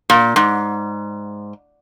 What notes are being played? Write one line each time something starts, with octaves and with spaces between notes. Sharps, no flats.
A#2
G#2